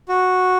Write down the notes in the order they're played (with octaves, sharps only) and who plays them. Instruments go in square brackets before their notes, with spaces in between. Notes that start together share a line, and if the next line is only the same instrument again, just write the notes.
[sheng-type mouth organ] F#4